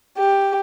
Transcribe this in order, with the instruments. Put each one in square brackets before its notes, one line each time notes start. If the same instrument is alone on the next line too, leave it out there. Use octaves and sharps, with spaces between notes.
[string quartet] G4